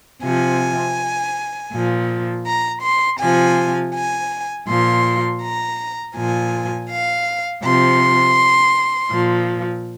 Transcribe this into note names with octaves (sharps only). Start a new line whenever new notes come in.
C3 F3 G#5
A#2 F3
A#5
C6
C3 F3 G#5
G#5
A#2 F3 C6
A#5
A#2 F3 G#5
F5
C3 F3 C6
A#2 F3